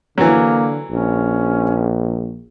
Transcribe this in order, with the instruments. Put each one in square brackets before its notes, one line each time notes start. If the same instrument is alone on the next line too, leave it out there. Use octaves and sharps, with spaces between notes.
[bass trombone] D3 [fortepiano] E3 F#3 [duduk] A#3
[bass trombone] A#1 [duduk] C#4